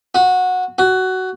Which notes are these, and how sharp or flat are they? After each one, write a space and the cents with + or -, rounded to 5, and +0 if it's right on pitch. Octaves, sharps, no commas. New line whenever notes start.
F#4 -15
F#4 +15